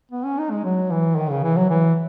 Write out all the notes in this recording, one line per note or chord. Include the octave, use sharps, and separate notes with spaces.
B3
C#4
D#4
G#3
F#3
E3
D#3
C#3
E3
F#3
E3